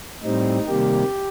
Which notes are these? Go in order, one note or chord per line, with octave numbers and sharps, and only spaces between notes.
A2 G3 C4 D#4
C3 D#3 G3 A#3 G4